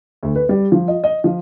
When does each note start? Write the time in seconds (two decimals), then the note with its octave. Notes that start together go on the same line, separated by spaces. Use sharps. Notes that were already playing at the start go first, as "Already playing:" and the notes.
0.23 D2
0.36 B4
0.49 G3
0.72 F3
0.88 D#5
1.04 D#5
1.24 F3